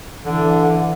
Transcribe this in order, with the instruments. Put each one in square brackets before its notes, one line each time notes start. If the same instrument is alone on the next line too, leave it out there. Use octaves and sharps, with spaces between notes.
[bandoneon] D3 [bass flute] E3